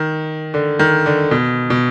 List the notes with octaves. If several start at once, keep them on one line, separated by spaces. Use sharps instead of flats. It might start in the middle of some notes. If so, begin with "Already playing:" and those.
Already playing: D#3
D3
D#3
D3
B2
B2